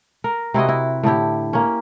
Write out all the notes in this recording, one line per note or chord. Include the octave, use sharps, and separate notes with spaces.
A#4
C3 E4 F#4 D#5
E4
A2 D3 E4 G4
A#3 C#4